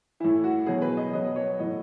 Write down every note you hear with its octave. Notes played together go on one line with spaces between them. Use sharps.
A2 E3 E4
F#4
B2 F#3 G#4
B4
D#5
B2 F#3 D#5
C#5
A2 F#3 D#5